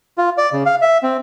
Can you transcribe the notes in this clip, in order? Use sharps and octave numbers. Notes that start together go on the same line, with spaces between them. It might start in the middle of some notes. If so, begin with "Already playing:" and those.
F4
D5
C#3
F5
E5
C4